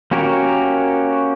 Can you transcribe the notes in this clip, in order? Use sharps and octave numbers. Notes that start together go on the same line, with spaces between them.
A#3 C#4 F#4 G4 A#4